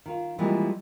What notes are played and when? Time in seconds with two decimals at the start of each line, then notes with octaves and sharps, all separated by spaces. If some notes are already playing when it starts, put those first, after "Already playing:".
0.06 D#3 F4
0.39 E3 F3 G3 G#3 A#3 C4